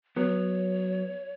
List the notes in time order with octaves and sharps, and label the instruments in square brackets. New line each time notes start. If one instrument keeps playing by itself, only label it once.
[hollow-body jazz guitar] F#3 B3 [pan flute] C#5